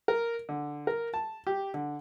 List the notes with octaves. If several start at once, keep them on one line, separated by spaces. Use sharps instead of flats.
A#4
D3
A#4
A5
G4
D3